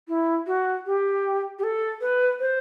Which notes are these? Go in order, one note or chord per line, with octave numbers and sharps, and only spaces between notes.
E4
F#4
G4
G4
A4
B4
C5